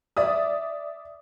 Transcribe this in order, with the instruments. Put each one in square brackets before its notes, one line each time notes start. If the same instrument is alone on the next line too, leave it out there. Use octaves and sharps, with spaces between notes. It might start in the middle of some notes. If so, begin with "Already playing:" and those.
[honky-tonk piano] D5 E5 D#6